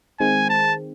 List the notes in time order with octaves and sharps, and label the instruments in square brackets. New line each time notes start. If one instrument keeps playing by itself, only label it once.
[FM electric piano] D#3 G#3 C4 [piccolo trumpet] G#5
[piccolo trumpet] A5